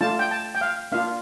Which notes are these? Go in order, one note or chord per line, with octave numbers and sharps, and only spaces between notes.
A3 D4 F4 A5
G5
A5
G5
F5
A#3 D4 F4 F5